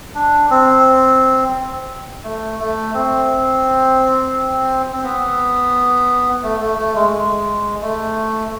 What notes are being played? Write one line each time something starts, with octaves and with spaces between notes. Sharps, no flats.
D4
C4
A3
A3
C4
C4
B3
A3
A3
A3
G#3
G#3
A3